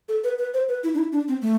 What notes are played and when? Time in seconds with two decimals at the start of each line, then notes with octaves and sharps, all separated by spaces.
0.09 A4
0.24 B4
0.38 B4
0.54 C5
0.69 B4
0.84 E4
0.94 D4
0.98 E4
1.12 D4
1.28 C4
1.42 A3